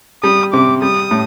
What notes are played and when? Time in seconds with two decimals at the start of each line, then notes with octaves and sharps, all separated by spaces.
0.23 G3 D#6
0.53 C3 D6
0.82 G3 D#6
1.11 A2